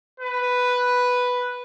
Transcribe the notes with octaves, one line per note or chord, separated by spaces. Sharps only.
B4